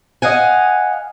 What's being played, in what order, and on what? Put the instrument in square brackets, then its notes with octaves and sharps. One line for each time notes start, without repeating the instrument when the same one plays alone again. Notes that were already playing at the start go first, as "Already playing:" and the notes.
[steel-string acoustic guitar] D#5 F5 F#5 G#5